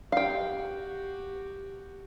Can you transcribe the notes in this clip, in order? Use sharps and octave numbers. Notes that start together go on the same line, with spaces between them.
F#4 G4 F5 G5